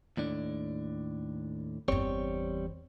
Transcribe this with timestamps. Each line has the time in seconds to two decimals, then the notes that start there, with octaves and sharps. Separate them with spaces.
0.17 D#2 A2 D4
1.88 G1 E2 G3 C4 C#5